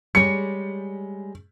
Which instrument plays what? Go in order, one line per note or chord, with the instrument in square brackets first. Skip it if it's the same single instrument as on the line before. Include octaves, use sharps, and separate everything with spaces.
[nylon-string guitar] G3 G#3 C#5 [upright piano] C#7